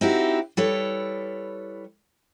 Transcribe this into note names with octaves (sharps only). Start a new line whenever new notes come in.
C4 D#4 E4 F#4 G4
G3 E4 A4 B4 C#5